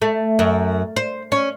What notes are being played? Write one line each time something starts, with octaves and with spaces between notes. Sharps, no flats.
A3
F#2
C5
C#4